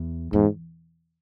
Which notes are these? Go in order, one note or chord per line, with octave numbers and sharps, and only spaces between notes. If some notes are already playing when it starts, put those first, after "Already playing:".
Already playing: E2
E2 G#2